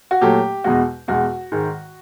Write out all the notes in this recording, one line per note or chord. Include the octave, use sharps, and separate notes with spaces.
F#4
A#2 F#3 A3 G4
E2 B2 G#3 F#4
E2 B2 G#3 F#4
G#2 D#3 G#3